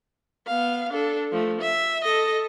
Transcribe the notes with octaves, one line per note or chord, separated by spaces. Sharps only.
B3 F5
D4 A4
F3 A3
E5
A4 D#5